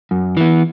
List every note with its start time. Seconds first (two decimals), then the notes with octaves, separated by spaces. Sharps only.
0.11 F#2
0.37 E3 B3